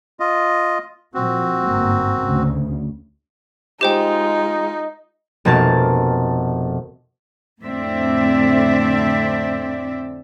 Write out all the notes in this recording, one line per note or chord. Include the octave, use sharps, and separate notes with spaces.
F4 D#5
A#2 F3 C4 F#4
G1 G#2 A#3
D2 C#3
G#3 D#4 F4 G4 C5 G5
F1 B2 A#3 A5
F2 A2 D3 C4 D5 E5